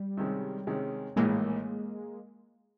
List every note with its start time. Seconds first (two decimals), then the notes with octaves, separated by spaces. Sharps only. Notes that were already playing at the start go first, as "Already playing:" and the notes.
Already playing: G3
0.17 C3 D#3 G#3 C#4
0.67 C3 D#3 G#3 C#4
1.16 A#1 A2 E3 G#3 A#3